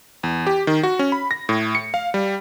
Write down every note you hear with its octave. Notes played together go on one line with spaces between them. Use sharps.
E2
G4
D#3
F#4
C#4
B5
A#6
A2
C#7
F5
G3